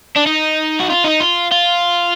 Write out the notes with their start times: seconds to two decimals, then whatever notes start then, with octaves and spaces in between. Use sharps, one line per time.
0.17 D4
0.27 D#4
0.80 F#4
0.90 F4
1.04 D#4
1.20 F4
1.51 F4